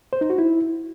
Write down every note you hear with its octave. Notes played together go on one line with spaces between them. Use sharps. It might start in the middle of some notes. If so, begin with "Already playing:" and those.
C5
D#4
F#4
E4